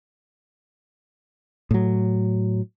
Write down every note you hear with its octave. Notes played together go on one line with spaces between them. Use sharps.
A2 F#3